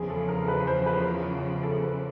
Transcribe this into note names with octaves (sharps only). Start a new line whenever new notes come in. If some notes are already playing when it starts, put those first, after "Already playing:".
Already playing: E2 C#3 F3 G#4
A4
A#4
B4
C5
B4
A#4
A4
B4